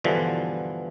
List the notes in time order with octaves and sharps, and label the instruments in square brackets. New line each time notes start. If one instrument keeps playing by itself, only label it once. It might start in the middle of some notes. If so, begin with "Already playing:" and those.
[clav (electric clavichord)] G2 B2 D3 E3 F3